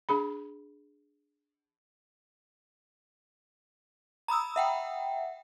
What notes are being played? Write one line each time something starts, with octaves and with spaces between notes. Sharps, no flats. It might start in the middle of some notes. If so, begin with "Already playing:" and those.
D4 G#4 B5
A#5 B5 D#6 E6
E5 F#5 G5